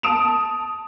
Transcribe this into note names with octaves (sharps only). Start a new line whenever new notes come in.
A5 D#6 D7 E7 F7